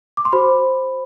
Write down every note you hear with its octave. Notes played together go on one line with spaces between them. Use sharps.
D6
C6
F#4 C5 B5